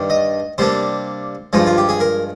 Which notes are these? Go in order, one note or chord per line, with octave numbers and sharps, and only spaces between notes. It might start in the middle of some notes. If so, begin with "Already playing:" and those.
Already playing: G2 D#3 G3 D4
D#5
C3 G3 A#3 D4 C5
G2 F3 G#3 D#4
F4
G4
G#4
A#4